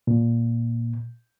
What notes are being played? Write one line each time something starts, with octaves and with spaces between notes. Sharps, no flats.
A#2